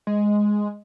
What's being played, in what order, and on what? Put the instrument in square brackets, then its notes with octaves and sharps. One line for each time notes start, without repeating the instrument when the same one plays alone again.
[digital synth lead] G#3